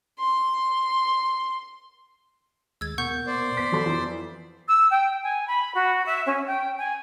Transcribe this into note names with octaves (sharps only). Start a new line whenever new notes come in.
C6
D#2 G#3 E6 G#6 A6
B2 A#3 F#5 C#6 G6
C5 D5
B3 B6
F#3 A4 C6
F2 E3
E6
G5
G#5
B5
F#4
E5
C#4
G5
G#5